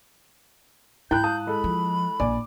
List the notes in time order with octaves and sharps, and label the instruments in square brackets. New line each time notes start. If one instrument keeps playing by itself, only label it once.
[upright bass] G#2 [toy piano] E4 [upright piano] G5 B5 F#6 [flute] G6
[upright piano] F5 A5 D#6
[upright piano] G#3 A4 [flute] B5
[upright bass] F3
[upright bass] A#1 [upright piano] D5 G#5 D6